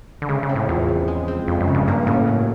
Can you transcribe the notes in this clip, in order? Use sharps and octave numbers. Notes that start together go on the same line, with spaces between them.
D3
C#3 G#3
C#3
C4
A2
E2 F3
C#3
G#3
C4
F2 F3
F#2
C#3
G2
G2 A#3
A2 C#4
F#3